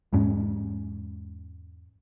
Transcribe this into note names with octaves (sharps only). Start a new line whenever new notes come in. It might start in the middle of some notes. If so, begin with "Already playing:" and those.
E2 G#2 G#3 C#4